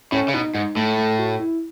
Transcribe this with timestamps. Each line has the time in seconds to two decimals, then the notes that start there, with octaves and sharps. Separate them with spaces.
0.12 A2 C#4
0.28 C#3
0.34 B2 D#4
0.54 G#2 D#4
0.75 A2 A3
0.97 A3
1.19 F#4
1.39 E4